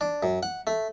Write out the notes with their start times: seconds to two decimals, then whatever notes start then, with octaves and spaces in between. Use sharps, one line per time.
0.01 D4
0.23 F#2
0.43 F#5
0.67 A3